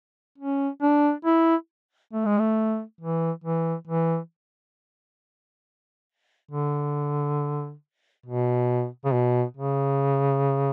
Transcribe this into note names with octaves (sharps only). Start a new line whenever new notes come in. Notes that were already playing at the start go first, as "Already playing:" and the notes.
C#4
D4
E4
A3
G#3
A3
E3
E3
E3
D3
B2
C#3
B2
C#3